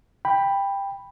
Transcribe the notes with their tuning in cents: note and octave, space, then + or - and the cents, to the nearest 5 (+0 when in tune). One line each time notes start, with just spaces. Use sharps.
G5 +15 B5 +0